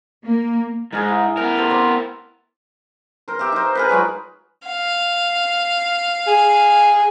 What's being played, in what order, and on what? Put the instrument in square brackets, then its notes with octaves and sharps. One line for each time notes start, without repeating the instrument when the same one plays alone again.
[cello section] A#3
[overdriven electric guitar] G#2 [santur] D#4 G#4 A#4
[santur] E4
[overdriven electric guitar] B3 A#4 [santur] G5
[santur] G4 A4 C5
C4 C6 D6
[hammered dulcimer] A#4 C5
G4 E5 F5
D#4 C5
G#4 A#4 B4
F#3 G#3 F4 B5
[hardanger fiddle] F5
[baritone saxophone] G#4